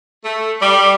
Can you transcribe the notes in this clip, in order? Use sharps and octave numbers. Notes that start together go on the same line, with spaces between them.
A3
G3